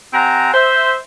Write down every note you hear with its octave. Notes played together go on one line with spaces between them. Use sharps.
C3 C4 F#5 G#5 A#5
C5 E5